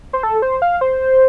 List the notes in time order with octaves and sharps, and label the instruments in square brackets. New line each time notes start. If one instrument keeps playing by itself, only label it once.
[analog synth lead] C5
A4
C5
F5
C5